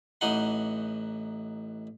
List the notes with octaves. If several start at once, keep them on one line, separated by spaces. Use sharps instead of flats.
A1 E3 D#4 D#5 F#5 C6